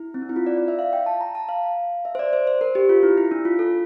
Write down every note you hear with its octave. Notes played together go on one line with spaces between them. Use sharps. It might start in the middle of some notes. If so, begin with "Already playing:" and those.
Already playing: E4
C4
D4
E4
F4
D5
D5
E5
F5
G5
A5
A#5
A5
F5
E5
C5
D5
C5
C5
A#4
G4
F4
E4
E4
D4
F4
A4